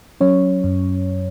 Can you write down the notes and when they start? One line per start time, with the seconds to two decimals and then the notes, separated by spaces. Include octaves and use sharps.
0.21 F#3 C#4 C#5
0.64 F#2